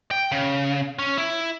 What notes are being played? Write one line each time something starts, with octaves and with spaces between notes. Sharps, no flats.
G5
C#3
C#4
E4